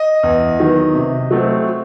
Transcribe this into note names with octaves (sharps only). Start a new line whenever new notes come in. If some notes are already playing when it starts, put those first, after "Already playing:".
Already playing: D#5
E2
D#3 F#3 B3
C3
F#3 A3 C4